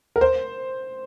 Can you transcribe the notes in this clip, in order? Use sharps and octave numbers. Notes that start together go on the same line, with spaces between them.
A#4
C5